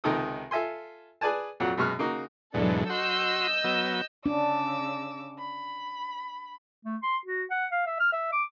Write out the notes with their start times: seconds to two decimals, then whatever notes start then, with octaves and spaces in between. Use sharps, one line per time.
0.04 C#2 C3 D#3 D#4 A4 D#6
0.51 F4 A4 E5 G#5 C6
1.21 G#4 B4 D5 G#5 A5
1.60 F2 A#2 F#3 F#4 F#5
1.77 F#2 B2 G#3 C#6 F6 F#6
1.99 C#3 A#3 D#4 F#4
2.54 E2 G#2 B2 F#3 D4 A4
2.90 F#4 D#5 C6 E6 G6
3.64 F#3 B3
4.26 C#3 D4 D6 E6
5.39 B5
6.85 A3
7.03 C6
7.26 F#4
7.51 F#5
7.71 F5
7.87 E5
8.00 F6
8.13 E5
8.33 D6